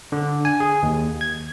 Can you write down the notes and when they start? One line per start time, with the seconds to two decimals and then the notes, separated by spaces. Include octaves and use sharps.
0.12 D3
0.45 G#5
0.60 G#4
0.83 D#2
1.21 G#6